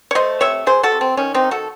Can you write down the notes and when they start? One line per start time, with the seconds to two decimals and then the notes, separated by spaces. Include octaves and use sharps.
0.11 C#5
0.15 A3 C5 D#5
0.40 C3 C#5 E5
0.66 F#3 G#4 C5
0.83 F#4 A4
0.92 C3
1.01 C4
1.17 D#3 C#4
1.34 C4 D#4
1.44 D#3
1.51 F#4 A4